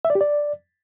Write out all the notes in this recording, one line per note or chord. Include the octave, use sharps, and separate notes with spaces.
E5
D5
G4
D5